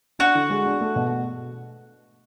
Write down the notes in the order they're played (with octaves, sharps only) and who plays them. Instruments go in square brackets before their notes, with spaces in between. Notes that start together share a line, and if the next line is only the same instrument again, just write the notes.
[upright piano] D4 [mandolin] F#4
[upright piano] D3
G#3
D4
A3
B2